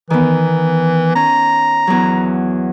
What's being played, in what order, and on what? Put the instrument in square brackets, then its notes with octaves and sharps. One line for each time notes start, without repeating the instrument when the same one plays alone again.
[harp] D#3 B3 [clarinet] E3
[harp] C#4 [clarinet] A#5
[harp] E2 F#3